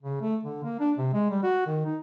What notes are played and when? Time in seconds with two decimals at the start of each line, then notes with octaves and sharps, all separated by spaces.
0.02 C#3
0.21 A3
0.43 D3
0.64 A#3
0.80 D4
0.98 C3
1.13 G#3
1.31 G3
1.43 F#4
1.67 D#3
1.85 D#4